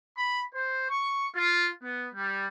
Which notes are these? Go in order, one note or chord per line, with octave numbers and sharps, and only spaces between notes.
B5
C5
C#6
F4
B3
G3